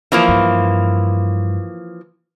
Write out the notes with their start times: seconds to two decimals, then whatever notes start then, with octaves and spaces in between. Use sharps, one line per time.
0.12 E3 F3 A#3
0.28 G2